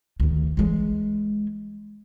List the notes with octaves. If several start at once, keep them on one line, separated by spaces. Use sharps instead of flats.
D2 D#3
E3 G#3